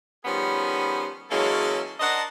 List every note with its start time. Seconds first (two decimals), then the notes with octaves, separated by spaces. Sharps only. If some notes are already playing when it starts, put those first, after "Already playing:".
0.25 D#3 F3 G3 B3 C#4 G#4
1.30 E3 F#3 G#3 A#3 C#4 A4
2.00 D4 A#4 C5 D#5 F#5 A5